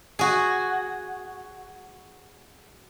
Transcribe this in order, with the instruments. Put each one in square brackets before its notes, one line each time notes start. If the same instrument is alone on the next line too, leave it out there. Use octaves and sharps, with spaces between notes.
[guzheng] F#4 G#4